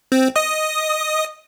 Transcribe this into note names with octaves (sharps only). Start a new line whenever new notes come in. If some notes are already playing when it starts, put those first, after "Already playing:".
C4
D#5 D#6